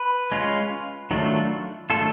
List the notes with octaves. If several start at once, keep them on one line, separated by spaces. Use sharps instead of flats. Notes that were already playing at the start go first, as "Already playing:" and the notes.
Already playing: B4
G#3 C#4 F4
D#3 F#3 A3 D4 F4
D#3 F#3 A3 D4 F4 A4